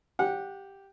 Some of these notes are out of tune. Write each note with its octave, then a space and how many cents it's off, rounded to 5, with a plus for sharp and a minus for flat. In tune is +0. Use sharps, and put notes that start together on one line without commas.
G4 +0 F#5 -20